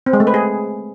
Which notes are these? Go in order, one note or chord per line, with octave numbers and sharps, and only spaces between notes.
C4
G#3
A3
B4
G#4